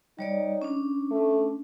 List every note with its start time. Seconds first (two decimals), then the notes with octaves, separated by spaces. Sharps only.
0.19 G3 D#4 C#5 D5
0.62 C#4 D4
1.11 A3